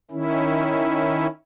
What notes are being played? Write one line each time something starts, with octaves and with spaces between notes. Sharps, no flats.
D#3 C#4 E4